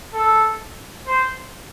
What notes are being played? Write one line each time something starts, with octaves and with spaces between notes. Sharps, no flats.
A4
C5